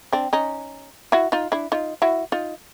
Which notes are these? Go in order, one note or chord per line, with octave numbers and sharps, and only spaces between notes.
C4 D4
C#4 D#4
E4 F#4
D#4 F4
D4 E4
D#4 F4
E4 F#4
D#4 F4